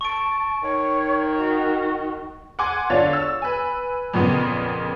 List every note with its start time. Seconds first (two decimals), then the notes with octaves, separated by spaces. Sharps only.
0.01 A5 C#6 D7
0.63 D#3 C#5
1.37 F#4
2.59 F#5 G#5 C6 D6 G#6
2.90 D3 D4 F4 C#5 A6
3.13 E6
3.42 B4 G#5
4.14 F2 A#2 C#3 B3